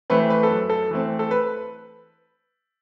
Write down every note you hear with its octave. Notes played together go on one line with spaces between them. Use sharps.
E3 A3 C4 B4
B4
A4
F#2
A4
E3 A3 C4
A4
B4